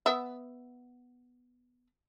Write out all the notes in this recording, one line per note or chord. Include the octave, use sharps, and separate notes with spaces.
B3 E5